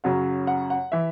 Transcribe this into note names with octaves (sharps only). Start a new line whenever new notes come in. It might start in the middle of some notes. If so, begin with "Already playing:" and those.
F#2 C#3 F#3 F#5
F#5
F#5
E3 E5